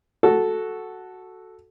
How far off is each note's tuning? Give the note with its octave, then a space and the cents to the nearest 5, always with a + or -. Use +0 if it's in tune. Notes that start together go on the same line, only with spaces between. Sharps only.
F#4 +0 A4 -5